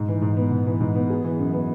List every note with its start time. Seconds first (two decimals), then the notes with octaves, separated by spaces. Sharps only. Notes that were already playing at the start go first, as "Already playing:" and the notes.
Already playing: G#2
0.08 E3
0.22 G#2
0.37 B3
0.51 G#2
0.67 E3
0.80 G#2
0.95 B3
1.10 G#4
1.24 E3
1.39 F#2
1.53 B3